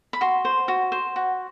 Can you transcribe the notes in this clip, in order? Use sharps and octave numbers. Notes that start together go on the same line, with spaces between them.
B5
F#4 C6
C5
F#4
C5
F#4